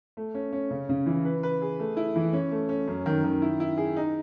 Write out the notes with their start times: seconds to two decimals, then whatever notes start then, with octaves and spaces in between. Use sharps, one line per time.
0.17 A3
0.34 C#4
0.52 C#4
0.71 C#3
0.89 C#3
1.06 E3
1.25 B4
1.43 B4
1.62 G#4
1.80 A3
1.97 E4
2.16 E3
2.33 C#4
2.52 A3
2.69 C#4
2.88 F#2
3.06 D#3
3.24 D#3
3.42 E4
3.60 E4
3.77 G#4
3.96 D#4